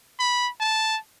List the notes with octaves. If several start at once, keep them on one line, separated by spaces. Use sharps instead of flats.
B5
A5